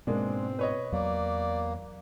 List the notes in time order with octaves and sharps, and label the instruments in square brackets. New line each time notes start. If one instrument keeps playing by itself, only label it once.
[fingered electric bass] G#2 B2 [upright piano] G#3 A#3 D4 [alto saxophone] C4
[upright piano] B4 C#5 D#5
[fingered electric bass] E2 F#3 [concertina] A#3 [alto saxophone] D5